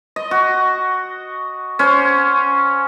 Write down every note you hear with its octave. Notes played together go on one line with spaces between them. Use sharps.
D#5
F#4
C#4 C5